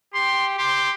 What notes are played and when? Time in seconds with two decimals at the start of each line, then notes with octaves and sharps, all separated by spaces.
0.14 G4 C6
0.58 G4 C6